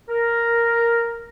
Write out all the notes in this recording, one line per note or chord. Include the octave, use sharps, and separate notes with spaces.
A#4